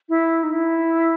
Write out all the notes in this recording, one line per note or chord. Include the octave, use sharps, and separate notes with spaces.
E4
D#4
E4